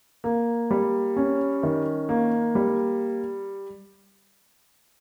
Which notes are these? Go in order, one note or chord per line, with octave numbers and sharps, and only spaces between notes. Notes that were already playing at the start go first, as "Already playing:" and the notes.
A#3
G3
C#4
D#3
A#3
G3